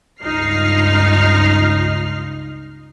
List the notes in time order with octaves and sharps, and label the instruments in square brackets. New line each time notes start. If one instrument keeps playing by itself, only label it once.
[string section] C#2 G2 D#4 F4 F6 C7